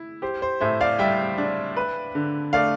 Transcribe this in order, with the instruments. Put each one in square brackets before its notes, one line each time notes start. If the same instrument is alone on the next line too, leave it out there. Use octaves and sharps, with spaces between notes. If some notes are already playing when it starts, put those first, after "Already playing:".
Already playing: [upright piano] E4
[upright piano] G4 [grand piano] C5
[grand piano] C5
[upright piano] A2 [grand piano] C5 E5
[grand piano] D5 F5
[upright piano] G3 [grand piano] E5 G5
[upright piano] D4
B4
D3
[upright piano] A3 [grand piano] D5 F5